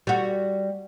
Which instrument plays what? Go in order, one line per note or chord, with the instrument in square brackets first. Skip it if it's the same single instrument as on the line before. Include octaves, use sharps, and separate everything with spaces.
[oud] G3 F#4